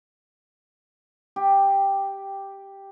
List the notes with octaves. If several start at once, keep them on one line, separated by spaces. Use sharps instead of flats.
G4